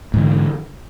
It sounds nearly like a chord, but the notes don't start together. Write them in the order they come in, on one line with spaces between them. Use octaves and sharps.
G#2 E3 D3